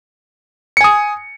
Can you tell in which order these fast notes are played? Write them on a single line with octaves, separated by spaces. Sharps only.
C#7 G#5 D#6